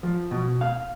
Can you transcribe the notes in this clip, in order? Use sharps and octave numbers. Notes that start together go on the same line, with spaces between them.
F3
B2
F5